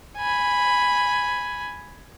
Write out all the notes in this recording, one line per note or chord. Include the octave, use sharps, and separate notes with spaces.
G#5 B5